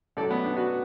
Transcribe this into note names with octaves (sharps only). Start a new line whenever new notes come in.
F#2 F#3 A4 D5
B3
D4
F#4 B4